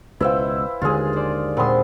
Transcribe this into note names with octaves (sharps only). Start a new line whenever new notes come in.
C#2 B2 E4 B4 C5 E5 F5 G5
D#2 D3 G#3 F4 G#4
C5 D5
A#2 G#3 C4 F#5 B5 C6 D#6